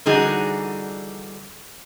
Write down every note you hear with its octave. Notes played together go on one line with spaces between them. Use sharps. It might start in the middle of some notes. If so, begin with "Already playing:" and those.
D3 E3 G3 D#4 F#4 G#4